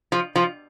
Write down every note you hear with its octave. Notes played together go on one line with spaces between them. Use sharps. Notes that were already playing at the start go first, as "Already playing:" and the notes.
F3
F3